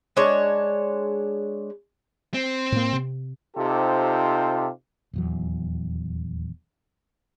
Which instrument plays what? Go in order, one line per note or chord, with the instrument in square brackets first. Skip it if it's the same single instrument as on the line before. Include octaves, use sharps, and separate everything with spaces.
[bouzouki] G#3 D4 C#5
[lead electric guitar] C4
[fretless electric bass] A2 A#3
C3
[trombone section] C3 D#4 F4 G4 A4 C5
[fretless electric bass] D#1 E2 F#3